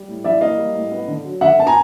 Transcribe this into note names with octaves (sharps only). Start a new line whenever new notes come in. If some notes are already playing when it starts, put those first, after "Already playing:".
Already playing: G3
A2
E3 D5 E5
A#3 D#5 F5
G3
A2
B3
D3
F#3
D3 E5 F#5
B3 A5
G#5 A#5